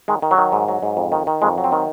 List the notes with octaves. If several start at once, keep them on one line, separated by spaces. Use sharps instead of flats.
D#3 G#3
D#3
F#3
D#3
G#2
F#3
G#2
F2
D#3
D#3
F2 G#3
F#3
C4
D#3